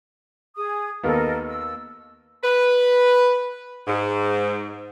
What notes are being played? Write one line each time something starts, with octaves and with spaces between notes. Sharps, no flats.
G#4 D#6
D#2 A#3 B3 A4 A#4 D#5
E6
B4
G#2